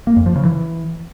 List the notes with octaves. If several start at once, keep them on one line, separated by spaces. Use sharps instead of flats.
A#3
F2
F3
C#3
E3